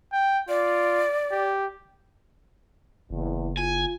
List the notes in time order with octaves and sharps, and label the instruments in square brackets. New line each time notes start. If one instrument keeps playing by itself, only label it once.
[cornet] G5
[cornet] F4 [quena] D5
[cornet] G4
[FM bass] F#1 [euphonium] E2
[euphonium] F4 [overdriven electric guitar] G#5